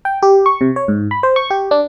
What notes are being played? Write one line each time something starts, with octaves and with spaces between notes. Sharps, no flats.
G5
G4
C#6
C3
C#5
G#2
B5
C5
C#6
G4
D4